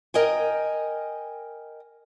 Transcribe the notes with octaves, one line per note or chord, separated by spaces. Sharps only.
A#4 D#5 G5 G#5